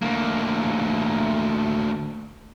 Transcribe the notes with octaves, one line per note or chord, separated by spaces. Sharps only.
D2 A#3